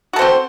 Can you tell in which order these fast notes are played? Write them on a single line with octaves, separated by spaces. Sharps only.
F#4 A4 C5 C4